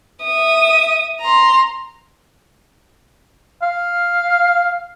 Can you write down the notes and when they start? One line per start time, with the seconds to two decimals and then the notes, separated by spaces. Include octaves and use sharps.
0.23 E5 D#6
1.21 A#5 C6
3.62 F5